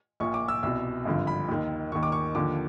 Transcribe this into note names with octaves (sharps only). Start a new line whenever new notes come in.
A#1 A#2 F3 C#6
D6
E6
C2 B2 E6
G#1 G2 D3 F3
B5
D#2 D#3
D#2 D#3 C#6
D6
C#6
D#2 D3 F3 D6